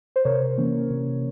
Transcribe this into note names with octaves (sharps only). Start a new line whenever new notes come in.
C5
C3 A#4 C#5
E3 A#3 C#4
C3